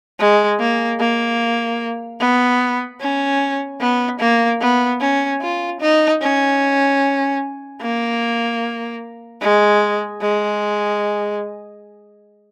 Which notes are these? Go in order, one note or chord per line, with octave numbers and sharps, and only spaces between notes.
G#3
A#3
A#3
B3
C#4
B3
A#3
B3
C#4
F4
D#4
C#4
A#3
G#3
G#3